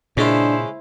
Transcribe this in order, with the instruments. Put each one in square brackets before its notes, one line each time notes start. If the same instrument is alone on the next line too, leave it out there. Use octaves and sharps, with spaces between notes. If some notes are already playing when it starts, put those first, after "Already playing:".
[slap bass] A#2 [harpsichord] C#3 G#3 C#4 [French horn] D4 [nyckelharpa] E4 C5